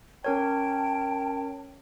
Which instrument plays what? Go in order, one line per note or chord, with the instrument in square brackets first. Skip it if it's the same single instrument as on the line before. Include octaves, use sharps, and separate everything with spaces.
[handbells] C#4 A#4 C#5 [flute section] G5 A5